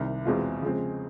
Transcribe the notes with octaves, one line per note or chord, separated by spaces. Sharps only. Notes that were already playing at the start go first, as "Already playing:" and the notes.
Already playing: C2 C3 D#3
E2 B2 G#3 C4 F4
C#3 F3 G#3 C4